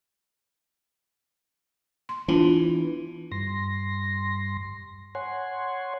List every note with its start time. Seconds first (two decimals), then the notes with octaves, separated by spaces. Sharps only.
2.09 C6
2.28 E3 B3 D4 F4
3.32 G2 C6 A#6
5.15 C#5 F#5 G#5 C6